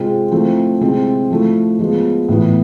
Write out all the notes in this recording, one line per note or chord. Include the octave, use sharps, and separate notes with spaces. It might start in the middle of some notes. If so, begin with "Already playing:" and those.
Already playing: C3 G#3 C4 F4
F3 A3 C4 E4
C3 G#3 C4 E4
F3 A3 E4
F3 G#3 B3
A2 E3 B3 E4